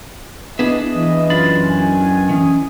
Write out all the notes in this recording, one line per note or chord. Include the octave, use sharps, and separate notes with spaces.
B3 D4 E4 G#4 D#5 E5
E3
F#2 D4 F4 B5 A6
B2 D#3 G#5
E3 C#4 D#6